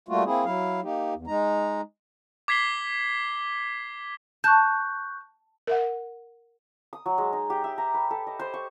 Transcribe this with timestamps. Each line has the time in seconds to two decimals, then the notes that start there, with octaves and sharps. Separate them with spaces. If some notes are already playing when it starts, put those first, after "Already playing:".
0.08 G3 A3 A#3 F4 F#4
0.25 A#3 C4 E4 G#4
0.45 F#3 E4 F5
0.83 A#3 D#4 G4
1.14 E2
1.27 G#3 D#4 A#5
2.48 D6 G#6 B6 C7 G7
4.44 A5 C#6 F#6 G6
5.67 A#4 E5 F#5
6.93 D#6
7.06 F#3
7.18 G#3
7.33 D#4
7.50 G4
7.64 E5
7.78 A#5
7.94 B4
8.11 A4
8.27 D#5
8.39 C5
8.54 C#6